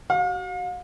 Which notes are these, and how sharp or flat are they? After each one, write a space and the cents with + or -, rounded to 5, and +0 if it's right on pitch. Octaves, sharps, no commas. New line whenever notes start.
F#4 +40 F5 +40